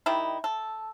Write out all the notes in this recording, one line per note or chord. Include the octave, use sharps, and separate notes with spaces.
D#3 G3 D#4 E4
A4